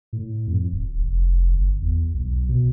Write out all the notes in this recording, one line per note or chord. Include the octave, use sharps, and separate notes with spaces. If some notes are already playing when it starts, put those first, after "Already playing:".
A2
F2
D1
F1
G1
E2
B1
B2